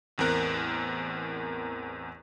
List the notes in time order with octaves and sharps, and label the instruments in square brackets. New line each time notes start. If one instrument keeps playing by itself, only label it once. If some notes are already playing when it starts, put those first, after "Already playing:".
[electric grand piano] A1 E2 C4 A#4 F#6